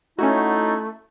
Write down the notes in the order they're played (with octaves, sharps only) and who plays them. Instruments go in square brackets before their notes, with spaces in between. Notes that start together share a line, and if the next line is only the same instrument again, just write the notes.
[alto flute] A3 [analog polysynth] C#4 F#4 [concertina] D#4 [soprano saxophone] E4